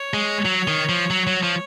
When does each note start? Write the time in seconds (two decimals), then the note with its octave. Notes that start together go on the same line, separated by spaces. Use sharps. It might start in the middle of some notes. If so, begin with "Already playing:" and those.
Already playing: C#5
0.14 G#3
0.45 F#3
0.68 D#3
0.89 F3
1.10 F#3
1.27 F#3
1.43 F3